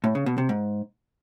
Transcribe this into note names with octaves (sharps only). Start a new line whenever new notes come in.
A2
C#3
B2
C3
G#2